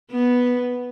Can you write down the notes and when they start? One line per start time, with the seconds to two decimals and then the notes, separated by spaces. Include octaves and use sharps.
0.11 B3